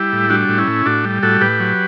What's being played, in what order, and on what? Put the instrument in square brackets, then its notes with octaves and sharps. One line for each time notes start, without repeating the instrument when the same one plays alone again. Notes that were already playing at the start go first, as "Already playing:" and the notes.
Already playing: [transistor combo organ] G3 E4 G4
A2
G3 D4 F#4
A2
C#4 E4
A2
A2 D4 F#4
G3
A2 F#4 A4
A2 G4 B4
F#3